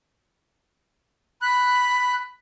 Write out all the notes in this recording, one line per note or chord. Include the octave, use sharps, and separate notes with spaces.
B5 F#6